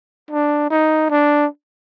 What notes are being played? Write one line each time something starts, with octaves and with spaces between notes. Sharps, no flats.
D4
D#4
D4